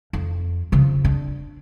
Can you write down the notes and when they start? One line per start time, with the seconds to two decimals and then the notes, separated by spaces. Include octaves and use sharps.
0.13 F2
0.72 C#3 F3
1.05 D4